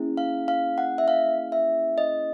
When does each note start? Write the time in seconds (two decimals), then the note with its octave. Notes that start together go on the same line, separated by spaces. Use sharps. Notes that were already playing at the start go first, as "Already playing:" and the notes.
Already playing: A#3 C#4 E4 G#4
0.17 F5
0.48 F5
0.78 F#5
0.98 E5
1.08 F5
1.52 E5
1.98 D#5